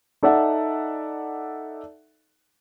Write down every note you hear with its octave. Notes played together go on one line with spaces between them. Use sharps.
D#4 A4 D5 E5 F#5